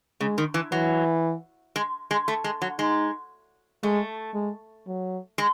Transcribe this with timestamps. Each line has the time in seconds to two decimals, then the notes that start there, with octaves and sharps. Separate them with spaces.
0.21 C#3 G#3
0.38 D#3
0.54 E3
0.72 E3 F#3
1.76 G#3
2.11 G#3
2.28 A3
2.44 G#3
2.62 F#3
2.79 G#3 D#4
3.83 G#3 A3
4.34 G#3
4.87 F#3
5.38 G#3